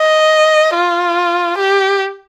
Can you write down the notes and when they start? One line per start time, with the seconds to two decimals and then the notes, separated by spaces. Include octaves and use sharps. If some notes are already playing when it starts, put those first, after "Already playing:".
Already playing: D#5
0.75 F4
1.58 G4